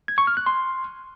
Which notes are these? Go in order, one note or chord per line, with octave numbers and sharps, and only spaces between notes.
G#6
C#6
F6
F#6
C6